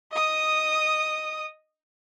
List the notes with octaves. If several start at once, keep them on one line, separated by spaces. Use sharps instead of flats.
D#5 D#6